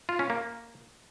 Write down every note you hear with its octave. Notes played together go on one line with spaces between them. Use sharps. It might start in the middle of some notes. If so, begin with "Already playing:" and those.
F4
C#4
A#3